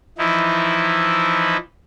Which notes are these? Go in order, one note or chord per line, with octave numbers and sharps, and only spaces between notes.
E3 F3 D#4 E4